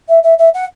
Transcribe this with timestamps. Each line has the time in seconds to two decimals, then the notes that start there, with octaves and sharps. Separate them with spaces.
0.09 E5
0.24 E5
0.39 E5
0.54 F#5